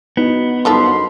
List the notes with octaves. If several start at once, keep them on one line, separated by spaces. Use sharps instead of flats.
B3 D#4 F#4
F#2 D3 F3 G3 D#4 A4 B5 C6